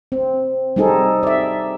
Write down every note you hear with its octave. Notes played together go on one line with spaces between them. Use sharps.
C4
G3 C4 D#4 G#4 A4
D5 E5